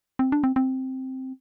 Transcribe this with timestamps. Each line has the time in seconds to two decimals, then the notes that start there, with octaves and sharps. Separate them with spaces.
0.19 C4
0.32 D4
0.44 C4
0.56 C4